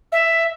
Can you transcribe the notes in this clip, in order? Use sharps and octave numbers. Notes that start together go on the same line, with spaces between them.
E5